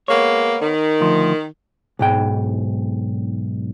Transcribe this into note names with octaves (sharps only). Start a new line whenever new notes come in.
G#3 A#3 B3 C#5
D#3
D2 F3
B1 G#2 G5